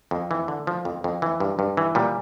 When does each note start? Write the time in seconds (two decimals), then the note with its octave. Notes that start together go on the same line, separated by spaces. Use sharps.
0.11 F2
0.31 E3
0.48 D3
0.67 F3
0.85 F2
1.04 F2
1.22 E3
1.40 G2
1.59 G2
1.77 E3
1.95 A#2 G3